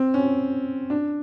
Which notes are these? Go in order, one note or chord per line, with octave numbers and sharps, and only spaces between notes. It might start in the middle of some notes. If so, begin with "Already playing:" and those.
Already playing: C4
C#4
D4